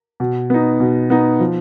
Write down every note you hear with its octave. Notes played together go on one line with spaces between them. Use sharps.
B2
B3 D#4
B2
B3 D#4
F3